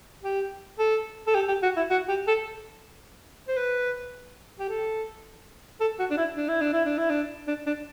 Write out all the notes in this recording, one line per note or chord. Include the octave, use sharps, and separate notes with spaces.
G4
A4
A4
G4
G4
F#4
E4
F#4
G4
A4
C5
B4
G4
A4
A4
F#4
D4
E4
D4
E4
D4
E4
D4
E4
D4
D4
D4